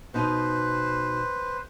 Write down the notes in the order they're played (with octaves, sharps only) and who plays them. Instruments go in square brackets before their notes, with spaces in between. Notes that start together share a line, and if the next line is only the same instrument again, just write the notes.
[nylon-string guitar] B2 D#4 [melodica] B4 C5